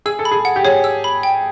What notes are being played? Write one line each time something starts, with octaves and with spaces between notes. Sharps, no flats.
G#4 E6
A4
B5
G#4
F#5
G4
G#4 C#5
E6
B5
G5